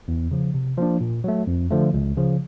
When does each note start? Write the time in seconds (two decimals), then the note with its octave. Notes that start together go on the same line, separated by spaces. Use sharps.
0.08 E2
0.31 C#3 F3
0.54 C3
0.77 F3 A#3 D4
1.01 A#2
1.24 F#3 A3
1.47 F2
1.71 D3 F3 A3
1.94 C#2
2.17 C#3 F3